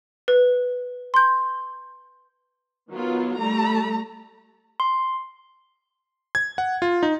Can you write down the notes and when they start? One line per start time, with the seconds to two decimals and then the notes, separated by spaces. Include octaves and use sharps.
0.28 B4
1.14 C6 G6
2.91 D#3 F#3 B3 F4
3.37 G3 A3 A#5
4.80 C6
6.35 G#6
6.58 F#5
6.82 F4
7.03 D#4